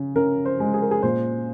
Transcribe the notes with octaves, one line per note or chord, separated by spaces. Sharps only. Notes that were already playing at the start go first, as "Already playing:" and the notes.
Already playing: C#3
C#3 A#4
C5
G#3
G#4
A#4
G#4
A#2 C5